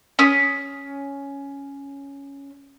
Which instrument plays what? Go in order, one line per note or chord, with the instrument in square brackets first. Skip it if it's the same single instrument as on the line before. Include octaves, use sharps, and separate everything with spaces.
[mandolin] C#4 D#6